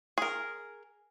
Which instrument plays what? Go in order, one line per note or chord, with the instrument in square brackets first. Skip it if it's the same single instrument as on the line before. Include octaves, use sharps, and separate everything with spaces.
[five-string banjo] G#4 A#4